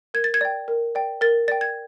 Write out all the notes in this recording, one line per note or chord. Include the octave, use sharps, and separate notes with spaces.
A#4 G#6
A6
G#6
D5 G5
A#4
D5 G5
A#4 A6
D5 G5 A6
G#6